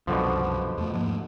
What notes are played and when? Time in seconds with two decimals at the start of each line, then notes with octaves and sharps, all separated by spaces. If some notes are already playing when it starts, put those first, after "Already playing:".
0.07 C2 F#2 B2 D3 F3
0.77 E2 A3
0.94 G#2 F3 A#3